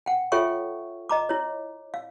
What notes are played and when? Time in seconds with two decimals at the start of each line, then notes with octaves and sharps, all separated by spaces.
0.06 F#5 G5
0.32 F4 A4 C#5 E5 G5 C#6
1.09 D#5 A#5 D6
1.29 E4 C#5
1.94 F5